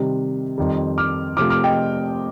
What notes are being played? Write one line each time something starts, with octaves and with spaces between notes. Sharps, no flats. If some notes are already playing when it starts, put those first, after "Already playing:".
Already playing: C3 D#3 G3
F2 D#3 G3
D6 F6
C3 F3 A3 D6 F6
D6 F6
D#5 G5